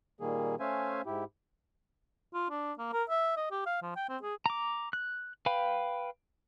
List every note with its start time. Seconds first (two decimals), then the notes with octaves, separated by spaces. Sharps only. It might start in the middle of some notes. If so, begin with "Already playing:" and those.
0.21 A#2 D#3 G3 A#3 G#4
0.60 A3 C#4 C5 E5 F5 G#5
1.06 G#2 E4 G4
2.34 F4
2.51 D4
2.78 A#3
2.93 A#4
3.10 E5
3.37 D#5
3.51 G4
3.66 F5
3.82 F3
3.96 G5
4.09 C4
4.22 G#4
4.46 A#5 D6
4.93 F#6
5.46 B4 F5 G5 B5